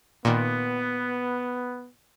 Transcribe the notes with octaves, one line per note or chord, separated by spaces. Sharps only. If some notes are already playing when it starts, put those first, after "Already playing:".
A#2 D#3 B3